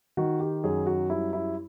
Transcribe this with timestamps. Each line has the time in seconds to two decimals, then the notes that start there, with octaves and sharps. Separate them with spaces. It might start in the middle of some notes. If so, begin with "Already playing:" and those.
0.17 D#3 F#4
0.40 G4
0.64 F#2 G#4
0.87 F#4
1.10 G3 E4
1.33 E4